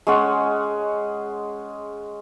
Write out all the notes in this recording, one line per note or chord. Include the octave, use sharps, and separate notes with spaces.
G#3 C#4 F#5